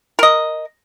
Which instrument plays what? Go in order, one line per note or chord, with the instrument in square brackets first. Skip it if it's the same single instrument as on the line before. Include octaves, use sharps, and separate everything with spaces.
[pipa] A#4 D#5